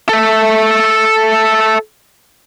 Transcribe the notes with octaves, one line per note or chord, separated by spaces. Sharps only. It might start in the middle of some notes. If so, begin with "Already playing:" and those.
A4 E5